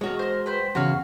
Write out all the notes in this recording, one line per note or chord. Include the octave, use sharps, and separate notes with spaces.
G#3 F#4 A#4 C#5
A#4 C5
B4 C5 G5
E2 C#3 F#4 C#5 F5